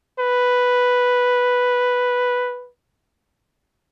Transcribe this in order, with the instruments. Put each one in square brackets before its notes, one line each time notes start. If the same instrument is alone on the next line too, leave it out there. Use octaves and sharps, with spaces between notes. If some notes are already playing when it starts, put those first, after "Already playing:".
[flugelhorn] B4